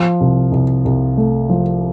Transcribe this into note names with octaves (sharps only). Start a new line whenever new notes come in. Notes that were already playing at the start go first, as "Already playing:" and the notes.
Already playing: F3
C2
C2
C2
A3
F3